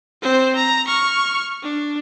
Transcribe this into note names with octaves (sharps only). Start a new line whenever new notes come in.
C4 C5
A#5
C#6 F6
D4